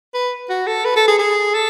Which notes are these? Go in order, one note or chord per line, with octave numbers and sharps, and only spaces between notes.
B4
F#4
A4
B4
A4
G#4
G#4
A4